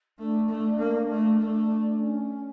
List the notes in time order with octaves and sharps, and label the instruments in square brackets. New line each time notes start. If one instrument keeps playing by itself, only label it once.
[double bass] A3 [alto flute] D4
[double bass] A3
A#3
A3
A3
[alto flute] C#4